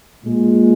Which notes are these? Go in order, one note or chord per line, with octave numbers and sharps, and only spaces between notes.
A#2 G#3